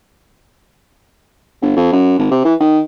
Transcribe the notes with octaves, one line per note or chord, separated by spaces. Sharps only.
G1
F2
F#2
G#1
C3
E3
D#3